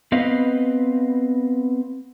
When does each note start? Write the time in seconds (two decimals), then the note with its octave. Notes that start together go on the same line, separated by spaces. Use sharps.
0.12 B3 C4 B4 D#5 F5